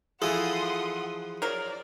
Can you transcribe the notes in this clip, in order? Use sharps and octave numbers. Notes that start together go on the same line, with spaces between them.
E3 F3 G#4 A4 F#5 C6 D#6
F3 F#3 A#4 D5